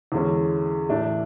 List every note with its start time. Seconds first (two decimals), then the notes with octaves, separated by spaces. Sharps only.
0.12 E2 D3 G#3 C#4
0.89 A2 E3 A3 D4